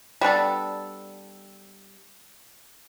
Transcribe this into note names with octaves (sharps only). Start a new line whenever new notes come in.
G3 B3 D4 A4